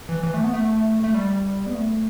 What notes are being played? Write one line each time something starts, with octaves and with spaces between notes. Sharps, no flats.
E3
E3
A3
B3
A3
A3
G3
B3
A3